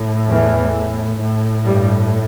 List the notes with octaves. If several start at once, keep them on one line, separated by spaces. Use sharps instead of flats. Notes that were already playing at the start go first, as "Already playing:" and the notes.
Already playing: A2
E2 E3
A2
G2 G3